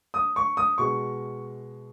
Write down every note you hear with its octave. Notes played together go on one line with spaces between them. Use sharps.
D#6
C#6
D#6
B2 G#3 C#6